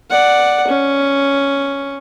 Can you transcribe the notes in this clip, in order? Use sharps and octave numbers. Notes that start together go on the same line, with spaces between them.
D5 F#5
C#4